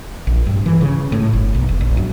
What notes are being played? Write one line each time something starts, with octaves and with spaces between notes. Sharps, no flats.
A#1
G2
E3
C#3
A2
G1
B1
F1
A#1
F#2